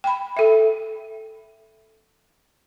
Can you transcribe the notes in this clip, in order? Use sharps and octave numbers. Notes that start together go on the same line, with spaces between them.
G5 B5
A4 E5